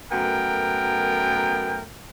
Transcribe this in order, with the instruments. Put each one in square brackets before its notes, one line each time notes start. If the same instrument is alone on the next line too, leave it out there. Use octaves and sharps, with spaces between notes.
[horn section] F#2 A3 B3 A#4 G5